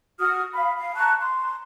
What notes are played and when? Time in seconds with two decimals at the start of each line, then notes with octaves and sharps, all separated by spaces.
0.19 F#4 D#6 F6
0.55 F5 B5
0.78 F5
0.96 A5 A#5 C#6 F#6
1.21 C6